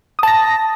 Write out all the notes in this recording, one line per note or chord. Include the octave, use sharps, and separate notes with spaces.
A5 D#6 A#6